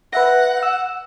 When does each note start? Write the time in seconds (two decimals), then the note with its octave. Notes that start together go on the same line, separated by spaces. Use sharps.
0.13 B4 E5 F#5 A#6
0.63 E6